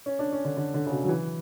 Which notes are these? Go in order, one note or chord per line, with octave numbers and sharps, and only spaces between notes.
C#4
D4
C#4
D3
D3
D3
C#3
B2
F#3
E3